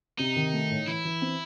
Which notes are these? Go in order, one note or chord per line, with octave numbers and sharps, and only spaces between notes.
C3 D#4
D#3
A3
A2
E3 E4
E3
C4